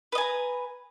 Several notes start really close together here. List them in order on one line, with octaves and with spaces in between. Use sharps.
B4 D#5 G#5 A#5